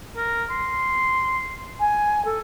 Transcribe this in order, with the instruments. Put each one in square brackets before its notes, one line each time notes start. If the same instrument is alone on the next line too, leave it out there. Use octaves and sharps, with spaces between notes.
[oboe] A#4
C6
[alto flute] G#5
A4